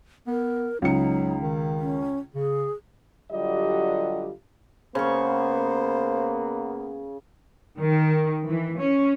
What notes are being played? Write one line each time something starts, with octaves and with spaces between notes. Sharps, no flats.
B3 A#4
C#2 F#3 D#4 C#7
D#3
C#4
C#3 G#4
D3 F#3 G3 F4 G4 D#5
C#3 A#3 B3 C5 C#6
D#3
E3
C#4